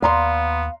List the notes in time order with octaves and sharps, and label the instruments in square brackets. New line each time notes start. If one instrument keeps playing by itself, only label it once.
[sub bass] D#2 [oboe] B3 [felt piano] D5 A#5 C6 [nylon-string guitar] F5